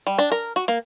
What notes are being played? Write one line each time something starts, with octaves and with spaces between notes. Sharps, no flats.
G3
D4
A#4
F#4
A#3